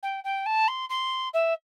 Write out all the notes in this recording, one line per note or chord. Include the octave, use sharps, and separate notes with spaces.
G5
G5
A5
C6
C6
E5